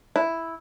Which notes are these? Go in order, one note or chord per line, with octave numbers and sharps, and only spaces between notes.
E4